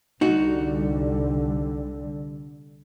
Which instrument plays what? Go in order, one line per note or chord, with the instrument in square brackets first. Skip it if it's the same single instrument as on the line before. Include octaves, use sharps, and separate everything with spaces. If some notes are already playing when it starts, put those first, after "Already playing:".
[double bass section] C2 D3 G3 [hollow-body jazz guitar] D#4 F#4